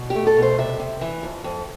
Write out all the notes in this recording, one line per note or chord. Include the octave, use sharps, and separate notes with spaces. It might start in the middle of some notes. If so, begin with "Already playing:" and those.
Already playing: B2
G4
A3
A4
B2
C5
C3 E5
C3
E3
F2
F2